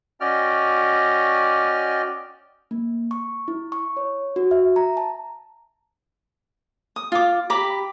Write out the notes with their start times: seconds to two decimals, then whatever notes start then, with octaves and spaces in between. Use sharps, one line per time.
0.21 C#4 F#4 D5 D#5 G5 F6
2.71 A#3
3.11 C#6
3.48 E4
3.72 C#6
3.97 C#5
4.36 F#4
4.51 E5
4.76 A#5
4.97 A5
6.96 D#6
7.12 F4 D6
7.50 G4 A#5 B5 D6